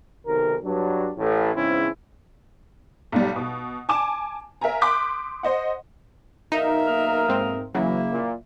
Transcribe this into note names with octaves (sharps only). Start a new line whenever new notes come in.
B1 C3 D#3 A#4
G2 F#3 D4
A1 A2
E2 G#2 C#3 C4 C#4 E4
B1 G#2 G3
B2
G#5 A5 D6 E7
A#4 E5 F5 G#5 A#5
C6 D6 D#6 F#6 G6 B6
C5 D#5 F#5
B1 D#4 A#4 E5 F5
A#3 D#6 F6
G#2 C4
C#3 E3 F#3 A#3 E4
A#2